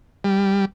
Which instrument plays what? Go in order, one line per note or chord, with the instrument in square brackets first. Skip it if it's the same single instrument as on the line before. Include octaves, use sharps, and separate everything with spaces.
[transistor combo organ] G3